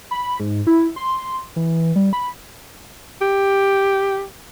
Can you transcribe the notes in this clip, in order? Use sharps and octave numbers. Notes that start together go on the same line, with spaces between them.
B5
G#2
E4
C6
E3
G3
B5
G4